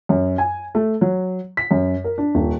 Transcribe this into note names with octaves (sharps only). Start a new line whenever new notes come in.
F#2
G#5
A3
F#3
B6
F#2
A#4
D4
D#1